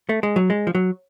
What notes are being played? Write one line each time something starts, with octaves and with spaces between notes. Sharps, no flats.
A3
G#3
F#3
G#3
F3
F#3